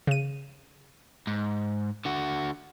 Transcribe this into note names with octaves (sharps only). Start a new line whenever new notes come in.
C#3 D#7
G#2
D3 F#4